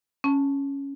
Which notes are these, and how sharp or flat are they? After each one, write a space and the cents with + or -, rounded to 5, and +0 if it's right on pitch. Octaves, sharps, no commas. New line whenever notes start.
C#4 +0 A5 +0